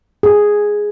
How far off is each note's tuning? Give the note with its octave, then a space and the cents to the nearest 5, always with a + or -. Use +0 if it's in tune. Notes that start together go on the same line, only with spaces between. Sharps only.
G#4 +0